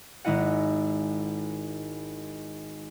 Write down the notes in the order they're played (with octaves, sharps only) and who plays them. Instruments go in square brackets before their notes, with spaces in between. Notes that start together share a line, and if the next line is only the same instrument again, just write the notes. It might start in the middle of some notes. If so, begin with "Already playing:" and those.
[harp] G#1 G#3 E4 D#5 F#5